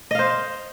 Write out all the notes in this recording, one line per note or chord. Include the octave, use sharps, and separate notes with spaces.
C5 D#5 F5